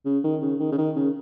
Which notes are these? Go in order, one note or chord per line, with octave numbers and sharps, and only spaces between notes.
C#3
D#3
C#3
D#3
C#3
D#3
C#3